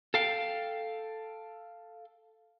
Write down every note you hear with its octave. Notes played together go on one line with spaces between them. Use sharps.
A4 F5 G5